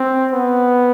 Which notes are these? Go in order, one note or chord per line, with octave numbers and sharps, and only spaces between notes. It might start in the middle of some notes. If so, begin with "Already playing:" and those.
Already playing: C4
B3